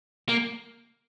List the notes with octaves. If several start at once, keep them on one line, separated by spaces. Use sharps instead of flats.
A#3